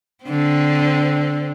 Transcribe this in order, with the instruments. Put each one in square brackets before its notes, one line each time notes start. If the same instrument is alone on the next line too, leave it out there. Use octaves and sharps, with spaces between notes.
[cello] D3 C4